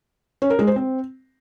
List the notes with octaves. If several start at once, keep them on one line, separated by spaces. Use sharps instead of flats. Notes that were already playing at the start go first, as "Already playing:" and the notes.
C#4
A#4
G#3
C5
C4